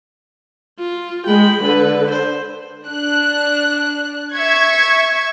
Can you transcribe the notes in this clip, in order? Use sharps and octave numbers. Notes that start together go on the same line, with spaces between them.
F4
G#3 G5 B5
D3 B4
C5
D4 F#6
E5 C#6 G#6